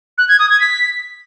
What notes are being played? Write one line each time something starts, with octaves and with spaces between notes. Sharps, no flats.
F#6
G#6
D#6
G#6
B6